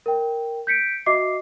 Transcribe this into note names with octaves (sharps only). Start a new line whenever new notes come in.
A#4 G5
G6 B6 C#7 D7
F#4 D#5 E5 D6 C7